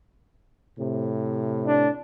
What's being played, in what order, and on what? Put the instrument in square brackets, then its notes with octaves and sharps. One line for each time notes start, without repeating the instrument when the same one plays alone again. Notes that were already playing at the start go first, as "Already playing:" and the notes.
[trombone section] A2 C3
[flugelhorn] D4